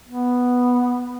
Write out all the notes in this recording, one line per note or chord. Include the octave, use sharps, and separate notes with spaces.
B3